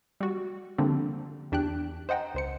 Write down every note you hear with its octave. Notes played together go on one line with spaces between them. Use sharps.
G3 F#4
D3 F3 G3 A#3 C4 D4
E2 D4 G4 G5 F#6
C5 D#5 F#5 G5 A#5
C#2 C5 C#7